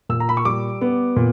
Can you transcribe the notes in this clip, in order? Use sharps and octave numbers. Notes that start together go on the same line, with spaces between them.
A#2 E6
A#5
B5
C#6
G3 D6
B3
A#2